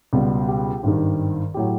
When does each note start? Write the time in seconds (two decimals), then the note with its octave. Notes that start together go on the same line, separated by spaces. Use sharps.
0.13 C#2 B2 G3 B3
0.48 G4
0.83 G#1 G2 D#3
1.54 A2 F#3 G4